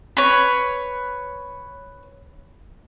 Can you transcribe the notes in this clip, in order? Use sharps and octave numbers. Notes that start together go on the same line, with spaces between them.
B4 C#5